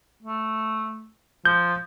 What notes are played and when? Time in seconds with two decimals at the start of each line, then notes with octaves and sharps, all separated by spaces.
0.23 A3
1.45 F3 G6